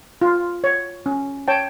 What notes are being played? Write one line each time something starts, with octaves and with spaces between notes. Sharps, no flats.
F4
C#5
C#4
C#5 G5 A5